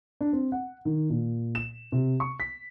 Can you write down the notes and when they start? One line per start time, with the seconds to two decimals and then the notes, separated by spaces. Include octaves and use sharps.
0.21 D4
0.33 C4
0.52 F#5
0.85 D#3
1.10 A#2
1.55 E7
1.92 C3
2.20 C#6
2.40 B6